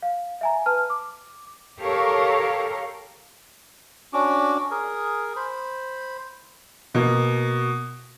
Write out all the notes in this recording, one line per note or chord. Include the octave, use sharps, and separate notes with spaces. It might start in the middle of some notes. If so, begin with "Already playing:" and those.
F5
E5 G#5 A#5
B4 A5 F6
D6
G4 A4 A#4 C#5 F5
C#4 D4 F#4 D6
G#4 A#4
C5 B5
B2 A#3